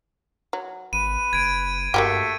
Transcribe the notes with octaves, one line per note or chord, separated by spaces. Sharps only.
F#3
G#1 B4 D#7
F#1 G#6 D7
G2 A3 A#3 F#4 G4